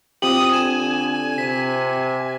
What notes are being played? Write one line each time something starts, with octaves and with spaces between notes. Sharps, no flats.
C4 F4 G4 D#6 F#7
D3 G#5 E7
C3 B6